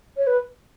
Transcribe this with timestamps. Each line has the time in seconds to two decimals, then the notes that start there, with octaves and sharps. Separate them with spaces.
0.17 C#5
0.27 B4